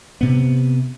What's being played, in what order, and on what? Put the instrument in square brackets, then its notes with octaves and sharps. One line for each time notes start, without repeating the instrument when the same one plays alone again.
[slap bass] C3 B3